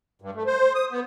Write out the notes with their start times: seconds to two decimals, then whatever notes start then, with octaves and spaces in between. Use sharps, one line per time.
0.22 G2
0.35 A3
0.46 C5
0.74 D#6
0.91 B3